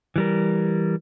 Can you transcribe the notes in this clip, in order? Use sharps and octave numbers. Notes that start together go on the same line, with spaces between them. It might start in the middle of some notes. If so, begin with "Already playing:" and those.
E3 G3 A#4